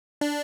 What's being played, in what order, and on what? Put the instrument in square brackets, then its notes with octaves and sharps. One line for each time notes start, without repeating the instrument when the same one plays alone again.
[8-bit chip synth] D4